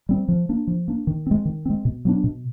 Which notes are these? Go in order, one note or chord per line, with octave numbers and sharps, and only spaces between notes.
G3 C4
F3
A#3 D4
F3
A#3 D4
D#3
G#3 C4
D#3
G#3 C4
B2
F#3 B3 D4
B2